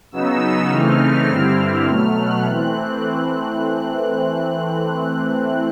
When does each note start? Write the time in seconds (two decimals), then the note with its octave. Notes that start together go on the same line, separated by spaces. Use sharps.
0.11 C#3 F#3 B3 D#4 E6
0.70 C#3 E3 A3 C4 D#4 F6
1.29 G2 D3 G3 C4 E4
1.87 B2 F#3 A3 F6
2.17 F#6
2.46 E3 A3 C4